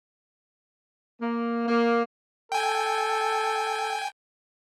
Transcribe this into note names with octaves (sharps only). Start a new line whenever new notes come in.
A#3
A#3
A4 G5 G#5